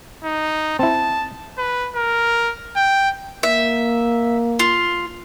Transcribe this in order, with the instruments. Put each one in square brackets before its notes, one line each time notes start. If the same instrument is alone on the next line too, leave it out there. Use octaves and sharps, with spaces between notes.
[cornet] D#4
[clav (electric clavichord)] C4 E4 [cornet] A5
[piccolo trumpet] B4
A#4
G5
[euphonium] A#3 [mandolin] E5
[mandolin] F4